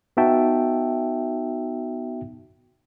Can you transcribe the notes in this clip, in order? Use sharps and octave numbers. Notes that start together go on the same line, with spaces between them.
B3 D#4 F#4 E5 G5 A5